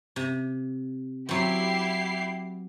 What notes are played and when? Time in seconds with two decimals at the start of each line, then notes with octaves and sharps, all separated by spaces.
0.16 C3
1.29 F#3 C4 E4 G4 C7